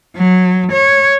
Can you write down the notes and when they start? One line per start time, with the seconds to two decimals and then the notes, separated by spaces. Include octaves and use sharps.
0.16 F#3
0.72 C#5